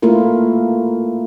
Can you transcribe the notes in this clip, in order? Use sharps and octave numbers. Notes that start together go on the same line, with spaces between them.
A3 A#3 E4 F4 A#4